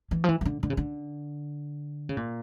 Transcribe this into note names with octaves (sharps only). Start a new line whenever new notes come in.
E3
F3
E3
E3
D3
D3
C#3
D3
C#3
A#2